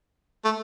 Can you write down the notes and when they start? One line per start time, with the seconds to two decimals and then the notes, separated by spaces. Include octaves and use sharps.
0.44 A3